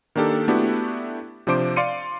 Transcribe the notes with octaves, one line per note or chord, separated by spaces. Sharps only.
D#3 A#3 D4 G4 A4
A3 B3 D4 E4 F#4 G4
C3 F3 D4 C5 D6 D7
D5 F5 C6 C#7 D#7